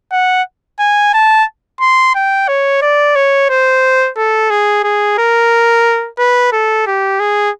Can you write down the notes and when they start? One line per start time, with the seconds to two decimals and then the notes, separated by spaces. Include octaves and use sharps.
0.12 F#5
0.79 G#5
1.14 A5
1.81 C6
2.15 G5
2.48 C#5
2.82 D5
3.15 C#5
3.50 C5
4.17 A4
4.50 G#4
4.84 G#4
5.18 A#4
6.19 B4
6.53 A4
6.87 G4
7.20 G#4